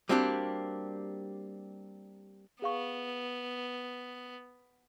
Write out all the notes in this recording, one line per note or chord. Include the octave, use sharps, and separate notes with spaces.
G3 A#3 C4 D4 F#4 G4
B3 G#4 F5 C#6